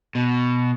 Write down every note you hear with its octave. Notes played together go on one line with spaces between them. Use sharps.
B2